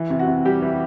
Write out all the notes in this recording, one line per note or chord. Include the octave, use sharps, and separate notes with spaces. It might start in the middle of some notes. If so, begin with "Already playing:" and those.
Already playing: E3
C3
F#4
C3
G3 G4
E3